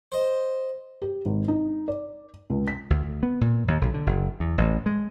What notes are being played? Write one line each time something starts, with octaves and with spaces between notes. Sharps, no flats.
C5 D#5
G4
G#1
D#4
D5
C#2
B6
D2
D2
B3
A#2
D#2
B1
D3
F#1
E2
A1
G#3